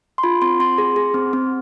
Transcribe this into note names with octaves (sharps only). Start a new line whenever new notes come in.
C6
F4 B5
C4 C6
C4 C6
G#4
G#4
C4
C4